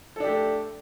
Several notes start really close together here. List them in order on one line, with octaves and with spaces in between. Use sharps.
A4 D4 G4 A3